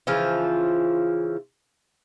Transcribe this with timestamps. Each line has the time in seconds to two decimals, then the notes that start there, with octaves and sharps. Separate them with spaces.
0.07 C#3 E3 F3 F4